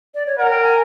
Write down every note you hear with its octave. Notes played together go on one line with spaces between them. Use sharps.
D5
C#5
A#4 F#5
G5
G#5